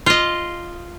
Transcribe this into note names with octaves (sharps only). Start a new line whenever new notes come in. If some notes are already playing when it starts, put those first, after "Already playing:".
F4 D#5